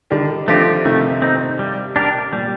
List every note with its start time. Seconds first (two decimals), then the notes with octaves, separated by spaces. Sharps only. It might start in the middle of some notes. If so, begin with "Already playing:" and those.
0.11 D3 D#3 G3
0.48 D3 F3 A3 C4 G4
0.85 C3 D#3 A3
1.22 C4 D#4
1.59 G3
1.96 D4 G4 A#4
2.32 A#2 G3